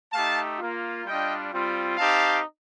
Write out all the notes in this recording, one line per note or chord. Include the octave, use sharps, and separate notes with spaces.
A3 D#4 G4 F5 A5
A#3 F4
G3 D4 F4 D#5 G5
G3 C4 F4
C4 D#4 G4 F5 A5